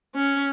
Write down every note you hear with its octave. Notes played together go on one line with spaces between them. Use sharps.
C#4